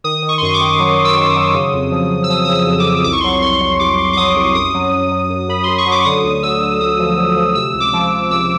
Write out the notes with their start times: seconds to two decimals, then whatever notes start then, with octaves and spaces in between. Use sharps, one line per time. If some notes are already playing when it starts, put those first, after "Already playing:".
0.04 D#3 D#6
0.22 D#3
0.29 C#6
0.38 C6
0.42 F#2 C#6
0.54 D6
0.61 D#3
0.79 F#3
0.98 F#3
1.05 E6
1.17 D#3
1.30 D#6
1.36 F#3
1.54 C#3
1.73 F2
1.92 F3
2.11 F3
2.24 E6
2.30 F3 D#6
2.45 C#3 D#6
2.55 E6
2.68 F2
2.80 D6
2.85 F2
3.04 C2 D6
3.13 C#6
3.20 C6
3.24 F#3 C#6
3.42 C2 C6
3.61 F#3
3.79 C2 D6
3.99 C2
4.13 D6
4.17 F#3 D#6
4.36 C2
4.55 F#2 D#6
4.74 F#3
4.93 F#3
5.12 F#3
5.29 F#2
5.48 F#2 B5
5.64 F#2 C6
5.78 C#6
5.86 F#3
5.91 D6
6.05 D3 D#6
6.24 D2
6.43 D3 E6
6.62 D3
6.80 D2 D#6
6.99 F3
7.17 D3
7.36 F3
7.55 C3 E6
7.74 C#2
7.80 D6
7.93 F3
8.12 F3
8.31 C#2 E6